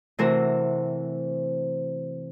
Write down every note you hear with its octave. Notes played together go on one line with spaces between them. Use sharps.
C3 E3 A3 C4 F#4 A#4